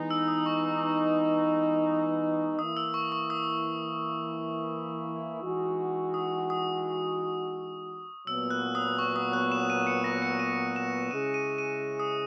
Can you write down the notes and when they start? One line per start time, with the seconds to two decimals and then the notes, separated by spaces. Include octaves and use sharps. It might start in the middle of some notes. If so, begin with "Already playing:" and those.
Already playing: E3 G#3 B3 D#4
0.11 E6
0.28 D#6
0.46 C#6
2.59 E3 A#3 E4 D#6
2.77 E6
2.94 C#6
3.12 C#6
3.30 D#6
5.43 E3 G#3 D#4 F#4
6.14 D#6
6.50 D#6
8.27 A#2 F#3 B3 E6
8.50 F#6
8.75 D#6
8.99 C#6
9.16 D#6
9.33 F#6
9.52 E7
9.70 D#7
9.87 C#7
10.04 A#6
10.22 C#7
10.39 D#7
10.76 E7
11.11 C#3 G#3 C#4 E4 G#4 D#7
11.34 D#7
11.58 D#7
12.00 D#6